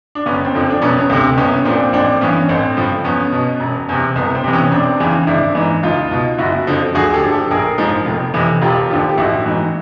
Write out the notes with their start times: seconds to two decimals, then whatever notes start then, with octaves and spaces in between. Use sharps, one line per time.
0.15 D4
0.26 F#1 B3 C#4
0.45 C4
0.55 F2 D3 F3
0.70 D4
0.82 E1 B3 C#4
0.99 B3
1.09 D2 C3 C4
1.38 C2 B3 C#4
1.65 A#2 F3 C4 D4
1.93 A1 C4 D4
2.21 G2 E3 B3 C#4
2.49 A1 C4
2.77 G2 D3 F3
3.05 E2 B3 C#4
3.32 B2
3.60 E1
3.89 E2 C3
4.16 C2 B3
4.35 C4
4.44 C3 E3
4.53 B3 C#4
4.71 E1 C4 D4
5.00 E2 C#3 E3
5.27 G#1 D4 E4
5.55 G#2 E3
5.83 C#2 D#4 F4
6.11 B2
6.39 F#1 E4 F#4
6.67 F2 D3 F3
6.95 D2 F#4 G#4
7.06 G#4
7.14 G4 A4
7.23 D3 F3
7.32 G4 A4
7.51 A#1 G#4 A#4
7.78 G#2 F3
8.06 F1
8.34 F2 C3 E3
8.62 E1 F4 G4
8.90 D#2 D3 F3
9.09 G4
9.18 A1 E4 F#4
9.46 G#2 E3